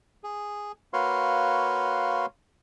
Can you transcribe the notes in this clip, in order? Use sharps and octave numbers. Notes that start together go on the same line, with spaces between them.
G#4
A#3 F#4 B4 C#5 F5 C6